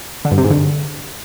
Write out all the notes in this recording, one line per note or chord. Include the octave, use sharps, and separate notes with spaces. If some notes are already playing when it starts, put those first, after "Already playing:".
D3
G2
C3
G#2
D3